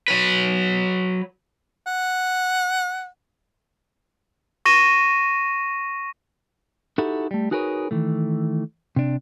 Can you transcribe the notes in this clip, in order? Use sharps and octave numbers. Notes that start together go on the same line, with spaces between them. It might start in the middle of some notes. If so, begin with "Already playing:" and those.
F#3 B4
F#5
C#6 A#6 D#7 E7
D#4 E4 F#4 G4 A4
G3 A3
D#4 F#4 G#4 A#4 B4 C#5
D#3 E3 A3
C3 D4